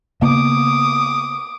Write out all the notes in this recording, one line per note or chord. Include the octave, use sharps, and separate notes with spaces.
C#3 A#3 B3 D6 D#6